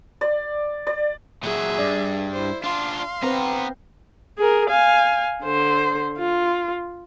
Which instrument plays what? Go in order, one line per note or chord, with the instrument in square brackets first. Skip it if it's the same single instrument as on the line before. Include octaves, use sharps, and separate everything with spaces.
[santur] D5
D5
[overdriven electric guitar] A#2 F#3 [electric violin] G#4 E5
[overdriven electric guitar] G2 [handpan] D5
[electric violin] E4 C5
[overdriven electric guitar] D4 F4 [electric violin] F5 C6
[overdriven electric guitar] B3 A#5 [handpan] C4 B4 C5
[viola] G#4 A#4
F5 G#5
D3 C5
F4